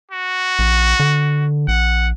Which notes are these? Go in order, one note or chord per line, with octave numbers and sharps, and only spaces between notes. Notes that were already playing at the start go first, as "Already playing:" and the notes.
F#4
A#1
D3
A#1 F#5